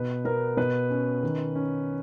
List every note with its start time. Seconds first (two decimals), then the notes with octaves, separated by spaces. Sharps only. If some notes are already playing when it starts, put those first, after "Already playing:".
Already playing: B2 B4
0.25 B3 A#4
0.57 B2 B4
0.90 C#4
1.23 D#3
1.56 C#4